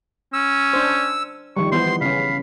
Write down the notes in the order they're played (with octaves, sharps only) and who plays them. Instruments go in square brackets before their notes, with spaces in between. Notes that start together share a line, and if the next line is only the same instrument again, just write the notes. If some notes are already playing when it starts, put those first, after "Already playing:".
[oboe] C#4 [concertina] E6
[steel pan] D4 C5
[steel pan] D#3 F3 G3 [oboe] C#6
[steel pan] E3 B3 [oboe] C5 [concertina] C6
[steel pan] C#3 C#4 [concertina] F5 [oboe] B5